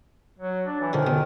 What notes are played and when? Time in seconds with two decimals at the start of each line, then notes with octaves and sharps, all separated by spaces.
0.39 F#3
0.67 D4
0.81 E3
0.93 D3 D#3 F3
1.07 F2 B2